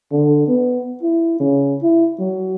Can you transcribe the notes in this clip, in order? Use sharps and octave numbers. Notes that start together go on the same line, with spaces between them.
D3
B3
E4
C#3
E4
F#3